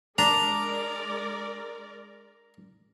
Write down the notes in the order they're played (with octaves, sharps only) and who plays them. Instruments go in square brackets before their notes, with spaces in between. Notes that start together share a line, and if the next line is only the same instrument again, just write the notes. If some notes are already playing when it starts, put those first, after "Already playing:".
[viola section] G#3 A#4 D5 [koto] D4 [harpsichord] A#5